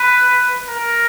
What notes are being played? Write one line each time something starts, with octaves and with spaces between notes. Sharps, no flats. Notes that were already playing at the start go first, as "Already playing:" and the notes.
Already playing: B4
A#4